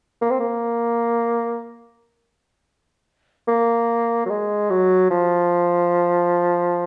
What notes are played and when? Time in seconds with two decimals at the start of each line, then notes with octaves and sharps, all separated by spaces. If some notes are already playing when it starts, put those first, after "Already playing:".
0.22 A#3
0.31 C4
0.40 A#3
3.48 A#3
4.26 F#3
4.30 G#3
4.70 F#3
5.11 F3